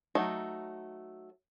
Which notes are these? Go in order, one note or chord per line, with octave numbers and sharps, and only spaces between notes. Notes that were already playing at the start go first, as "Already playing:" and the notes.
F#3 A3 D#4